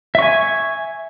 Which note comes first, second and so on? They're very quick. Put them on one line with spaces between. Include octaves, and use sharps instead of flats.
E5 C#6 G#5